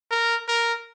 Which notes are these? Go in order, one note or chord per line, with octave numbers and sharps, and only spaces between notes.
A#4
A#4